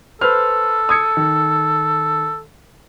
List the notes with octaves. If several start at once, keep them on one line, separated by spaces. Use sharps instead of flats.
A4 B4 C5 F6
D#6 G#6 C#7
D#3